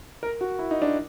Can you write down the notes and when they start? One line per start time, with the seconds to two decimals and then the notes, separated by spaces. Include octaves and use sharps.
0.23 A#4
0.41 F#4
0.59 E4
0.71 D#4
0.82 D4